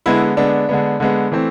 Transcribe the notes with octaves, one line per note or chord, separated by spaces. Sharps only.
D3 G#3 B3 E4
D3 G#3 B3 D4
D3 G#3 B3
D3 G#3 B3
E3 A3 C4